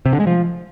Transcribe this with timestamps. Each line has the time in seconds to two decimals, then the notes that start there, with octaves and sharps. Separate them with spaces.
0.06 C3
0.13 D3
0.20 G#3
0.27 F3